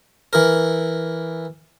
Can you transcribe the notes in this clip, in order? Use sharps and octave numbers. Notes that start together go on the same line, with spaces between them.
E3 A#4